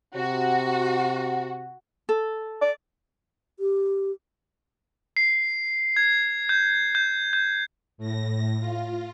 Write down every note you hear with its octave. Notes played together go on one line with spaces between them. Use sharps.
C3 F#4
A4
D5
G4
C7
G#6
G6
G6
G6
A2 A#6
F4